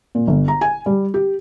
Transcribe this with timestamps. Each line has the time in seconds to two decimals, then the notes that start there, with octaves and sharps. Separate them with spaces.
0.15 A#2
0.27 G1
0.48 A#5
0.61 G#5
0.86 G3
1.14 G4